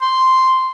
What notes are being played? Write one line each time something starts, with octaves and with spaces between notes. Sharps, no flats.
C6